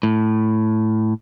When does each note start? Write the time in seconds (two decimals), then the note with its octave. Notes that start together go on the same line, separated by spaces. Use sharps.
0.03 A2